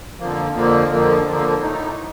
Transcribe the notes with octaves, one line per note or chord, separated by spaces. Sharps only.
F2 D3 F3 A#3
F2 D3 F3 A#3
F2 D3 F3 A#3
F2 D3 F3 A#3
A2 A3 D#4